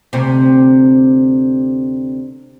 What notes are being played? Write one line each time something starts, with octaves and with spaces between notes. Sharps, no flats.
D2 C3